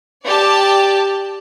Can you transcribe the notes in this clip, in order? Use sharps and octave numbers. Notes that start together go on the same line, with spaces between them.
G4 D5 A5